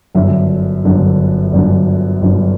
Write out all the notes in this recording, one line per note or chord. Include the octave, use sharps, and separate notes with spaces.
G1 F#2 D3 E5
G1 F#2 D3
G1 F#2 D3 D5
G1 F#2 D3